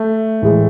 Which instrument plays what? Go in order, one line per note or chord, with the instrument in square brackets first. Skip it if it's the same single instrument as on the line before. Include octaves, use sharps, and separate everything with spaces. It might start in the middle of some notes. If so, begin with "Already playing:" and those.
Already playing: [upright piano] A3
[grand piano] A2 E3 G#3